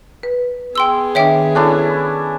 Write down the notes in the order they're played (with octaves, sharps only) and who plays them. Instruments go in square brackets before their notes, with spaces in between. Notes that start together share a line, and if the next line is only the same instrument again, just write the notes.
[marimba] B4
[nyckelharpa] B3 G#4 [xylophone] G5 C6 E6
[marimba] D#3 D4 [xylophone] C#5 E5 G5
[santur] C#4 D4 E4 [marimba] A4